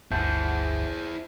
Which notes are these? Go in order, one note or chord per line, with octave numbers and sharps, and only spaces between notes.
G1 D2 E4 G#4 C5 E5 A5 G6